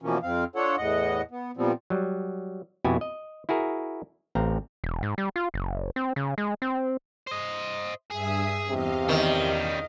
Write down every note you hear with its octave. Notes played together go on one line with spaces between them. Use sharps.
B2 E3 F3 A#3 C#4
F2 C4 F5
D4 F4 A4 C#5 F#5
E2 A2 D#5 F#5
B3
A#2 F3 G3 B3 C4
F#3 G3
F2 B2 E4 F#4 G4 G#5
D#5
E4 F#4 G#4 A#4
A1 C4 F5 A#5
E1
G#2
G3
F4
F#1
C4
C#3
G#3
C4
C5 D#5
G2 G#4 E5 D#6
E2 C3 D#5 F5
D#3 G3 C#4